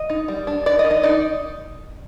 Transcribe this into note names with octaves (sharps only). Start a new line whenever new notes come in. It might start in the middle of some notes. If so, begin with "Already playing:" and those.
Already playing: D#5
D#4
G3
D4
D#3 D5
D#5
D#3
D#5
D#4 D5